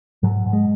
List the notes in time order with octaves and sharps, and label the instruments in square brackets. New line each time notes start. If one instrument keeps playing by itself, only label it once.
[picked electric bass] G#2 F#3
G#2
G#3